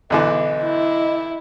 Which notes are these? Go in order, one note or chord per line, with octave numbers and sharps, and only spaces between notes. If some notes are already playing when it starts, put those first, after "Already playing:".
B1 D3 E3 D#5
E4